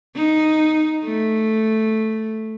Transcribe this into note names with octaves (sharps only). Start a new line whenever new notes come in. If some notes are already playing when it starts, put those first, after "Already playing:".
D#4
A3